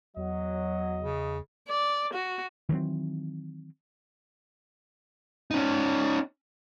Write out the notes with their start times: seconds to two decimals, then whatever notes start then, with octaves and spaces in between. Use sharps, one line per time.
0.17 E2 F#3 D#5
1.02 C#3
1.68 D5
2.13 F#4
2.69 D#3 E3 F#3 C4
5.51 C#4 D#4